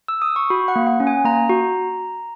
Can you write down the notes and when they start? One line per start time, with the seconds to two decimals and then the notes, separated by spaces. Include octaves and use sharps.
0.08 E6
0.22 D#6
0.36 C#6
0.50 F#4 B5
0.68 F#5
0.76 A#3
0.87 F#5
1.00 C#4
1.07 G#5
1.25 A#3 A#5
1.49 F#4